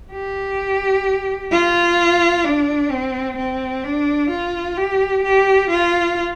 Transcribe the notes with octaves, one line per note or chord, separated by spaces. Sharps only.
G4
F4
D4
C4
C4
D4
F4
G4
G4
F4